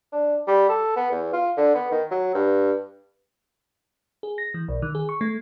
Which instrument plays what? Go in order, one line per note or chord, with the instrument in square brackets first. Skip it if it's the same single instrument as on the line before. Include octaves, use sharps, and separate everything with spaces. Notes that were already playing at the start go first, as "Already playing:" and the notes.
[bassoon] D4
G3
A4
B3
E2
F4
D3
B3
D#3
F#3
G2
[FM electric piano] G#4
A#6
E3
B1
D#3
G#4
C#6
A3